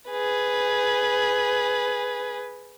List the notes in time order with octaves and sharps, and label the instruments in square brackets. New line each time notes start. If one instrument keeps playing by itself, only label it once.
[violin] G#4 B4